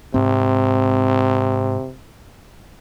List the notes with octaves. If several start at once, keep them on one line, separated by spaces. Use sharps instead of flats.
G#2 C3 C4